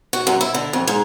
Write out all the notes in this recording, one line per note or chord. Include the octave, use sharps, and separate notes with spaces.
F#4
F#2
E4
D3
F2
G#2